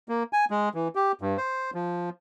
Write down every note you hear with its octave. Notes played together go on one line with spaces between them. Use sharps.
A#3
G#5
G#3
E3
G4
G2
C5
F3